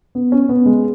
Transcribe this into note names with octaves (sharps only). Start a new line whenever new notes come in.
B3
C#4
B3
G#3